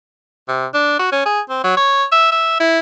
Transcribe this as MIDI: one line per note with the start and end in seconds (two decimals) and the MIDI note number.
0.48 0.66 48
0.74 0.96 62
0.99 1.09 66
1.12 1.26 61
1.26 1.41 68
1.50 1.61 60
1.64 1.76 54
1.77 2.05 73
2.12 2.29 76
2.32 2.57 76
2.60 2.80 64